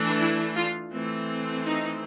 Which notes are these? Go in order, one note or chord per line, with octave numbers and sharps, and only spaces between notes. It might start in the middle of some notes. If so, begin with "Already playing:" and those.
Already playing: E3 A3 D4
E4
F4
E3 A3 C4
D#4